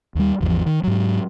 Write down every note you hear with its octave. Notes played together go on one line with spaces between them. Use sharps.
D#2 G3
G#1 E2 C3 F3
D#3
G#2 F#3